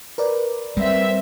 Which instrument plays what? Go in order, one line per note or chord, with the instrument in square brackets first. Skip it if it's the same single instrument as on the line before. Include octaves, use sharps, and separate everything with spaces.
[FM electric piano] A#4 B4 D5
[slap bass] G3 G#3 [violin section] C4 E5